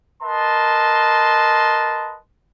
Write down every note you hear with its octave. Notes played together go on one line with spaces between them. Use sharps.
A#4 B4 D#5 A5 C6